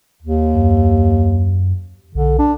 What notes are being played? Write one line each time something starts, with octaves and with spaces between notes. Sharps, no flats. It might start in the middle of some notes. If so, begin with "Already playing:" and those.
D#2
F#2
B1 D3
D4